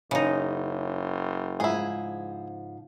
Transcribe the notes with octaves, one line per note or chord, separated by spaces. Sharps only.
F#1 C#3 D#4
G#2 F3 E4 G#4